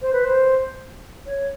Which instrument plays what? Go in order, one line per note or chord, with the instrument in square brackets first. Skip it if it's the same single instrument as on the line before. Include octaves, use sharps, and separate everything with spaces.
[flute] C5
B4
C5
C#5